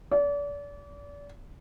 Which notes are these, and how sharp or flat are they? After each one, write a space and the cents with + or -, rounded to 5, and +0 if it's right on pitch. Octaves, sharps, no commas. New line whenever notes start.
D5 -35